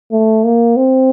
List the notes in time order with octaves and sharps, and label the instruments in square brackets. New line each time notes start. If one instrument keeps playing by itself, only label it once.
[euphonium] A3
A#3
C4